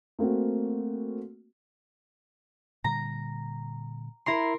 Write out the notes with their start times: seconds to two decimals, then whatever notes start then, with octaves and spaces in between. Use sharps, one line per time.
0.19 A3 A#3 C4 F#4
2.84 A#2 D3 G3 A#5
4.26 E4 A#4 A#5 C6 C7